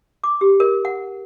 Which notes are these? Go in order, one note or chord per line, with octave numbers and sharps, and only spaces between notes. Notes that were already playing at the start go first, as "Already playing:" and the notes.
D6
G4
A#4
F#5